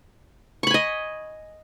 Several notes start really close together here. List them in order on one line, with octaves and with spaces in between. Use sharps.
C#6 B5 G#5 D#5